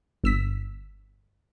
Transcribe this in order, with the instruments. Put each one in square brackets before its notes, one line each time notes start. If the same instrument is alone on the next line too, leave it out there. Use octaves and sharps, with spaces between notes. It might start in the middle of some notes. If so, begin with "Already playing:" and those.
[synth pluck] G1 E6 B6